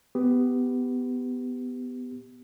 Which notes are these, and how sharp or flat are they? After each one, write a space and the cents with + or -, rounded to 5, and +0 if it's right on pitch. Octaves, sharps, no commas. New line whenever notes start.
B3 +15 G4 +0